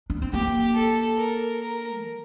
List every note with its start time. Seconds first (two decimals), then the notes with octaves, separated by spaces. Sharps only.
0.10 D4
0.22 C4
0.34 A#3 G4
0.75 A4
1.17 A#4
1.59 A#4
2.00 D#3